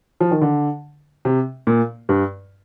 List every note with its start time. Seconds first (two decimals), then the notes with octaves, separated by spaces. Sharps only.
0.20 F3
0.31 D#3
0.41 D3
1.25 C3
1.67 A#2
2.09 G2